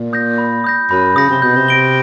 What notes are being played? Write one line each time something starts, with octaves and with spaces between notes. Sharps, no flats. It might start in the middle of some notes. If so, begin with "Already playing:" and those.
Already playing: A#2
D#6 G6 A#6
B5
D#6 G6 A#6
F#2 B5
C#3 D#6 G6 A#6
C3
B2 G6
C3
A#6 D7 G7